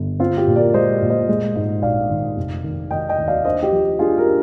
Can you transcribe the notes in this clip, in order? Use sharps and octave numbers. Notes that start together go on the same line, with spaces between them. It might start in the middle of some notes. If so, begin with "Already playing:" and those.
Already playing: G1
C4 F4
G4
A#2
A#4 D5
G#3 C5 D#5
A#2
C5 D#5
G#3
G#2
A#1 D5 F5
D#3
F1
D#3
D#3 D#5 G5
D#5 G5
D#2
D5 F5
D4 C5 D#5
G4
F3
D4 F4 G#4
G4 A#4
D4